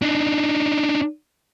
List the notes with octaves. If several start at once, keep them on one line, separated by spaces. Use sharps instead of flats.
D4 D#4